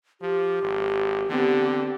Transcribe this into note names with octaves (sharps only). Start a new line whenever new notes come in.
F3 G4
G#1
D3 B3 C4 G4